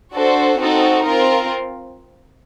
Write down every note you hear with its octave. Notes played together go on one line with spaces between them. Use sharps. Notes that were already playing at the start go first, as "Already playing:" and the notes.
D4 F#4 A4 C5
C4 D#4 F#4 A4
C4 F4 A#4